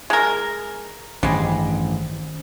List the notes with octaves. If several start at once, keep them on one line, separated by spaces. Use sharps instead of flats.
G#3 A#4
A1 G2 D#3 G3 G#3 C#4 C5